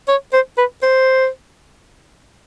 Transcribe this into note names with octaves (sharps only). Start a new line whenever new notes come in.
C#5
C5
B4
C5